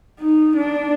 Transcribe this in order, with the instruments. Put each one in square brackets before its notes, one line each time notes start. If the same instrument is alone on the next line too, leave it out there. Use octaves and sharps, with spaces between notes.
[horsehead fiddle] D#4
D4